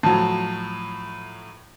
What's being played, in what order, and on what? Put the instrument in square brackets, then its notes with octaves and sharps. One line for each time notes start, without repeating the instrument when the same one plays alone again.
[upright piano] A2 F3 F#3 [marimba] A5